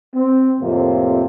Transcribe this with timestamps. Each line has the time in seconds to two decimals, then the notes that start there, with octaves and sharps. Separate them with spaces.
0.15 C4
0.61 F2 A2 C3 A#3